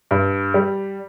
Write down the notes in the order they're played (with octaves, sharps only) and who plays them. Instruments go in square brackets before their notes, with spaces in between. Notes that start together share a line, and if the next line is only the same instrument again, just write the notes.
[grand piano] G2
G3